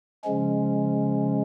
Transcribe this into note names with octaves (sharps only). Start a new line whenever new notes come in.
C#3 F3 G#3 C#4